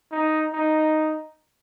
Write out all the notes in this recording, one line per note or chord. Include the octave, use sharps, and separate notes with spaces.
D#4
D#4